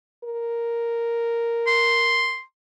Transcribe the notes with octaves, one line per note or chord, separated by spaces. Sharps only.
A#4
C6